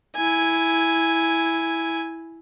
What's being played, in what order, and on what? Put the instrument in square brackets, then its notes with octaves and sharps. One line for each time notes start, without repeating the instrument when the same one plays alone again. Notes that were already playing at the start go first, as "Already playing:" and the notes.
[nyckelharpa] E4 G#5